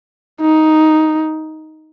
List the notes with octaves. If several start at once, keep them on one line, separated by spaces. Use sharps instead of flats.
D#4